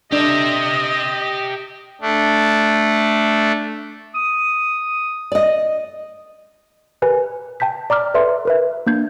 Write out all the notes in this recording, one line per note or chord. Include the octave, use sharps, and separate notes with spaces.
D4 G4 D#5 E5
A3 D4
D#6
D5 D#5
G4 A#4 B4 G#5
G5 A5 G6 B6
D5 A#5 D6 F6
A4 B4 D5 E5 C6
A#4 B4 E5
A#3 D4 G6 G#6